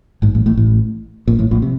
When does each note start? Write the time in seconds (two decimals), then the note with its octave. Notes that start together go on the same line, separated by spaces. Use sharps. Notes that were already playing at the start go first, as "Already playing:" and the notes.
0.22 G#1 G#2
0.35 A1 A2
0.46 A1 A2
0.57 A1 A2
1.28 A#1 A#2
1.39 A1 A2
1.51 A#1 A#2
1.62 C3